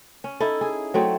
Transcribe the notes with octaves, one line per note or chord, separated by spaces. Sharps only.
C#4
D#4 E4 A4
G#4
F#3 A3 C4